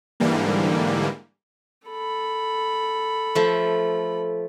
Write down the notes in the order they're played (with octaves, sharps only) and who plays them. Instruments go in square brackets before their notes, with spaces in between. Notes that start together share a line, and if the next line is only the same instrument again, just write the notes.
[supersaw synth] G#2 D3 E3 G3 A#3
[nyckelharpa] A4 B5
[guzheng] F3 A3